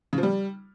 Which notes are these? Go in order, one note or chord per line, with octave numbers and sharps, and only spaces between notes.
C#3
F3
G3